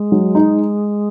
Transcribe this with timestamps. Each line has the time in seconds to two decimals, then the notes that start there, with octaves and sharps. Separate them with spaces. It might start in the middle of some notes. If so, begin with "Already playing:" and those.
Already playing: G#3
0.12 F#3
0.35 D#4